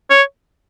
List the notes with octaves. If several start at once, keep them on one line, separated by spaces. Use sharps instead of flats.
C#5